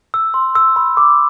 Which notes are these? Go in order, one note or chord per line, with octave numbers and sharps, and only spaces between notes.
E6
C6
E6
B5
D6